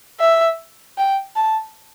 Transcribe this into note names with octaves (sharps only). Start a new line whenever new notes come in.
E5
G5
A5